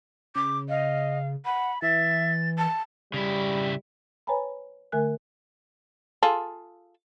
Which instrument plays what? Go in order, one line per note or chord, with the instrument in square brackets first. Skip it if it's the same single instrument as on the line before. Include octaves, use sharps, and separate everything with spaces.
[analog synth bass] C#3 [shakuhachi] D6
[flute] D#5 [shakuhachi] F5
[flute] F#5 [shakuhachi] B5
[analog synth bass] E3 [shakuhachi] E5 [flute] A6
[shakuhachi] A5
[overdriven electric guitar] C#3 E4 [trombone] G3
[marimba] B4 C#5 G5 G#5 A#5 B5
D3 A3 A#4 E5 G#5 F#6
[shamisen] F4 G#4 A4